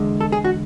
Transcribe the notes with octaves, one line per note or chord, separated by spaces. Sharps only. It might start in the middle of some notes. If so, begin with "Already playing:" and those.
Already playing: E2 D3 G#3
A4
G#4
F#4